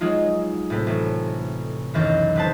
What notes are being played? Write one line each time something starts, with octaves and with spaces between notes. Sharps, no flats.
F#3 G#3 D#4 F4
A2 C3 A3
A1 A3
C#2 F#2 B2 D#3 E3
D2 G3 B4 C5 A5